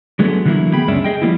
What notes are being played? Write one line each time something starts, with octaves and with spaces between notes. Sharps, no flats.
D3 F#3 G#3 A3 B3
D3 E3 F#3 A3 A#3 E4
B3 G#4 G5 B5
C#2 F#2 G#3 C#4 D4 E5
G#4 D#5 G5
F3 G3 A#3 B3 E4